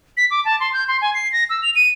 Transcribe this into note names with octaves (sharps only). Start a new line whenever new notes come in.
B6
D6
A5
C6
G6
C6
G#5
C7
A#6
E6
F7
D#7